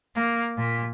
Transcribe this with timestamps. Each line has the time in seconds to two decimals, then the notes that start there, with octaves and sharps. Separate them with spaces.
0.16 A#3
0.57 A#2